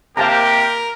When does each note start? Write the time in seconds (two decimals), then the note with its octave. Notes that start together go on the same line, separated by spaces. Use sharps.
0.17 C3 A#3 G4 A#4 F5 A5 A#5